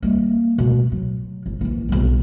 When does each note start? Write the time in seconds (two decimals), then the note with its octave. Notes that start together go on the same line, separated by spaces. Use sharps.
0.03 G3 A#3
0.58 B2 A3
0.92 F#3
1.46 G1
1.61 A#1 E3
1.89 B1 G3